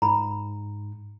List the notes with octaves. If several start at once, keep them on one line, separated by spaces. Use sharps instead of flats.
G#2 A#5 B5